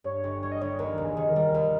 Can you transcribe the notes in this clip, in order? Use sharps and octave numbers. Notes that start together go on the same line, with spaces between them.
G2 C#5
G1
G3 C#5
D#5
G1 C#5
D#2 A#4
F1
G#4
D#3
A#4
G3
D#2